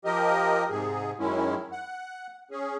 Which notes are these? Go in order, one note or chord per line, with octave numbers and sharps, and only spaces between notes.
F3 G4 A#4 D#5
G#2 C3 G#4
F#2 D#3 G#3 C#4 E4
F#5
C#4 G#4